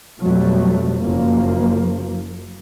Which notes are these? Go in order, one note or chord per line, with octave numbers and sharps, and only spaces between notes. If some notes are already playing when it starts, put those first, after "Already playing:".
F2 B2 F#3 G3 A3
F#1 F3 A#3